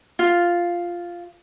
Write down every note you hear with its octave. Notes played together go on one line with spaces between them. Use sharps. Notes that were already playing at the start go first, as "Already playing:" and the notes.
F4